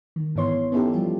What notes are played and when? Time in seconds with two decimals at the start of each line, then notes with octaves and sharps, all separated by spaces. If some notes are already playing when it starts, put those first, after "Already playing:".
0.16 D#3
0.36 G#2 E3 B3 C#5 C6
0.72 B3 C#4 D#4 E4 G4 A4
0.93 F3 G3 F4 G4